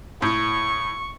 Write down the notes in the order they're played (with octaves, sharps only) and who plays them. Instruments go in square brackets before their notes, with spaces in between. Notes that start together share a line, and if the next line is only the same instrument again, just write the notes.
[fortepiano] A2 [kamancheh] C#6